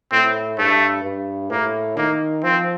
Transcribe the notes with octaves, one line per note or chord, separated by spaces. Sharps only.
A2 C4
G2 A3
G2
A2 A#3
D#3 A#3
F3 C4